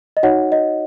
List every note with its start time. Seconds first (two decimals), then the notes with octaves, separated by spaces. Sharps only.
0.17 D#5
0.23 D#4 F#4 C#5 F#5
0.52 D#5